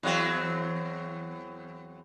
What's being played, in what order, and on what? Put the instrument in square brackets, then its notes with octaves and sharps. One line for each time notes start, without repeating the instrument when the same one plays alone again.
[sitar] E2 F#3 C4